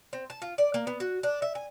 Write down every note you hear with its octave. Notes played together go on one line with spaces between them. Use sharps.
C4
A5
F4
D5
A#3
B3
F#4
D4
E5
G#5